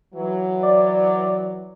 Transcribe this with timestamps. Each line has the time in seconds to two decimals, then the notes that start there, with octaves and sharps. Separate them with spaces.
0.15 E3 F#3
0.63 D5